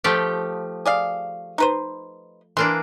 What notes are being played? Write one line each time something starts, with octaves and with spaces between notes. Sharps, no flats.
F3 A3 G4
G#4 D5 F5
D#4 B4 C5
E3 A#3 D4 C6